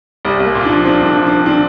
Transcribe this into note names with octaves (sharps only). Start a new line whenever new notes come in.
C2 G3
C2
A#3
A#2 F4
F3 D4
C4 D4
C2 D4
F3
C4 D4
A#2 D4